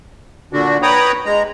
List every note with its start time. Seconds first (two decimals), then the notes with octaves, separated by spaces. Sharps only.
0.53 A#2 D3 D4 F#4
0.82 B4 C#5 G5 A#5 B5 D#6
1.25 G#3 A#5